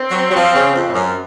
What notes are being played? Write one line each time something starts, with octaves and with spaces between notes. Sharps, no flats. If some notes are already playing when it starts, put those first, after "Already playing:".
Already playing: C4
F#3
F#3
F3
C#3
F2
A2
F#2